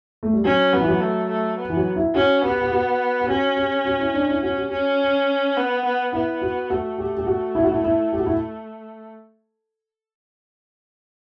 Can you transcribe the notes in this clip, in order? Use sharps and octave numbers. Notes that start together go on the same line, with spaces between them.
A3
G3
F#3 C#4
F#3 B3
E3
F#3
A3
A3
B3
E3
F#3
E4
C#4 F#4
B3 G4
G4
F#4
G4
C#4 F#4
G4
F#4
E4
D4
E4
C#4 F#4
G4
C#4 F#4
B3
B3
B3 E4
F#4
A3 F#4
G4
G4
F#4
E4
F#4
E4
E4
G4
F#4
E4